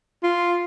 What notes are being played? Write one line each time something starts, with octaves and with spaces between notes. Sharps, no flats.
F4